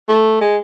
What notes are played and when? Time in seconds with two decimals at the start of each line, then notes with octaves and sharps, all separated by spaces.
0.09 A3
0.41 G#3